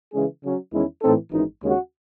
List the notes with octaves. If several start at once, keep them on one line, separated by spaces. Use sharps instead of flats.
C#3 E3 G#3 C#4 G#4
C#3 F#3 C#4
E2 D#3 G#3 C#4 E4
A2 E3 C4 D#4 A4
G#1 F#2 E3 G#3 D#4
D#2 C#3 G#3 C#4 F#4